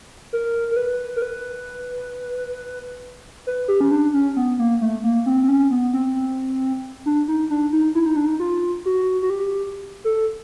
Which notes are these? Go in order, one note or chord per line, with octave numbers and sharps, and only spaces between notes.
A#4
A#4
B4
A#4
B4
B4
G4
C#4
D4
C#4
B3
A#3
A3
A#3
C4
C4
C#4
B3
C4
D4
D#4
D4
D#4
E4
D#4
D4
D#4
F4
F#4
F#4
G4
A4